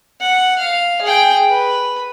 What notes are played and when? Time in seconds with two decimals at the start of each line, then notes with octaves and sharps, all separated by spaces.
0.21 F#5
0.59 F5
1.02 G#4 G5
1.49 B4